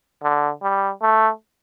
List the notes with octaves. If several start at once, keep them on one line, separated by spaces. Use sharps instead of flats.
D3
G3
A3